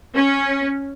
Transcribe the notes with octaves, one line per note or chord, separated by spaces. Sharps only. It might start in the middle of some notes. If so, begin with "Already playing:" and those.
C#4